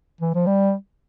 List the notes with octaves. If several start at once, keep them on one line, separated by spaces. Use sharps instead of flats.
E3
F3
G3